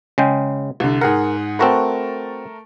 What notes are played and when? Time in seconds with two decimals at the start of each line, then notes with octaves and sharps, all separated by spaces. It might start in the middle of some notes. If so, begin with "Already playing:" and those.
0.18 C#3 G#3 G5
0.80 C2 D3
1.01 G#2 G#4 A#4 F#5
1.59 A3 C4 F#4 A#4 B4 A5